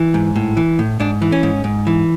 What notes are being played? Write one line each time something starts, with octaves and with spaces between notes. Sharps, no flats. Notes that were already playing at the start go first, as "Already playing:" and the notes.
Already playing: E3
G#2
A2
E3
A2
G#2 D4
E3
C#4
G#2
G#2
E3